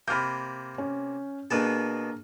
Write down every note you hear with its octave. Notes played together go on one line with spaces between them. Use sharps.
C3 A#3 B5 F6 G6
C#4
B2 A#3 B3 D4 G#4 A4